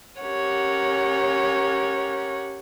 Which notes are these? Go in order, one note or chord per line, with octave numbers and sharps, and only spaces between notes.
C#4 G4 A#4 C#5 F#5